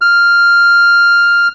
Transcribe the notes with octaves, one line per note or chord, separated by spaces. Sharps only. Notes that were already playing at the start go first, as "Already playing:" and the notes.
F6